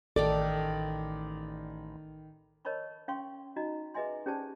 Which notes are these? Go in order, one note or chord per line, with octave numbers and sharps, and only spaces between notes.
A1 D#3 D#4 A4 D5 D6
A#4 C#5 D#5 A5 B5 C#6
C#4 F5 G5 C6 C#6
D#4 F#4 D#5 A#5
G#4 B4 D#5 E5 G#5 C6
C#4 G4 G#4 C5 D5 A5